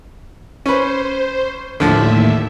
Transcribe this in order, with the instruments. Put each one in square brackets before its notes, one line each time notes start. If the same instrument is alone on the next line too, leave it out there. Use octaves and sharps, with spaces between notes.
[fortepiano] C#4 B4 [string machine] C5
[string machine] D#2 A2 E5 [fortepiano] D3 F3